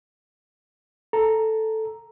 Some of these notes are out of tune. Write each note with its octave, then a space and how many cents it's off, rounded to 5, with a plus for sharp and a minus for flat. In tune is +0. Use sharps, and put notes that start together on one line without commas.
A4 +0 A#5 +0